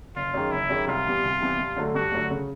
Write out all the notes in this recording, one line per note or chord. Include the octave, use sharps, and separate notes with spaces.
F#1 F4
F#2 D#3 G#3
F#1 E4
F#2 D#3 G#3
C2 F4
C3 E3 G3 B3
C2
C3 E3 G3 B3
G2
D3 F#3 A3
G2 F#4
D3 F#3 A3
C#3